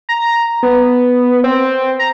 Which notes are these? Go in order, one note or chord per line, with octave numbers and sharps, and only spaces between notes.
A#5
B3
C4
A#5